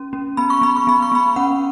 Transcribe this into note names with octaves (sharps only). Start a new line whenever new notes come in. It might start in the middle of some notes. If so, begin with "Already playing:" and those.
Already playing: C#4
C#4
B3 B5
C#6
B3 B5
C#6
B3 B5
C#6
B3 B5
C#4 F#5